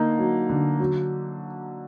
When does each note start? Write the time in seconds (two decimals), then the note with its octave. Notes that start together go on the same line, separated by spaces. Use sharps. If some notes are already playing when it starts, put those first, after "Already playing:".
Already playing: D3 A#3 D#4
0.19 F#3
0.49 D3
0.80 F#3